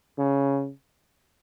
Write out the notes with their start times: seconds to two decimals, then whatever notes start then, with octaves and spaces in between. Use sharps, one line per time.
0.18 C#3